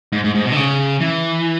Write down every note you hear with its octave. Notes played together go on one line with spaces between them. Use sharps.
G#2
G#2
G#2
B2
D3
C#3
E3